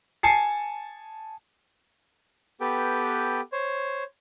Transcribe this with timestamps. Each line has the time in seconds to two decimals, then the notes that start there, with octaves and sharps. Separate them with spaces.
0.23 G#5 A5 C7 C#7
2.61 B3 G4 A4 B4 G5
3.52 C5 C#5